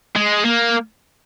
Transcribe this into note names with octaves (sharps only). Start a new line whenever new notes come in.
G#3
A#3